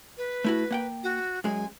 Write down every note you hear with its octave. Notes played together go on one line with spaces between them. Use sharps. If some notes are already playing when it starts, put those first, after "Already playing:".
B4
A3 E4 F#4
A#3 F#5 G5
F#4
F#2 G#3 G#5